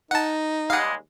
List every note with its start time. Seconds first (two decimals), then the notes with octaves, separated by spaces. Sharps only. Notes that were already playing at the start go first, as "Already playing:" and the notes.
0.11 D#4 F#5 A5
0.70 D#2 G3 G#3 F5 F#5